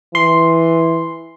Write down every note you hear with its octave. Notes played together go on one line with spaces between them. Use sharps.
E3 C6